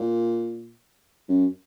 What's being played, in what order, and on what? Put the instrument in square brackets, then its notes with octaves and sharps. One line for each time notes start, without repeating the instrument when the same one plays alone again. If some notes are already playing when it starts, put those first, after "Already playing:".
Already playing: [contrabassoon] A#2
F#2